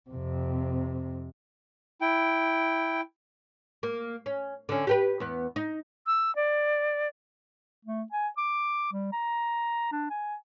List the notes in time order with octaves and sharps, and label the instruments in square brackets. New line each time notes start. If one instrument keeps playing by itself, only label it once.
[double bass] F2 C3
[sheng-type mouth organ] E4 G5
[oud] A#3
C#4
D3 C#4
G4 A#4 B4
E2 B3
D#4
[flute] E6
D5
[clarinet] A3
G#5
D6
G3
A#5
D4
G#5